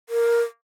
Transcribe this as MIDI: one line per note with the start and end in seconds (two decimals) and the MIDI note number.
0.09 0.41 70